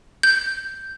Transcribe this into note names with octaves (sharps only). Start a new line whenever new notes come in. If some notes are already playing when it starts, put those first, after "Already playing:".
G6